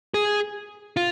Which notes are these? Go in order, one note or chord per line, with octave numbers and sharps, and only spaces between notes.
G#4
F4